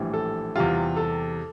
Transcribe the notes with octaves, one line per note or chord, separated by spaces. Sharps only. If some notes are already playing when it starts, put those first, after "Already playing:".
Already playing: A#1 A2 E3 G3
A4
E2 C3 G3 F4
A4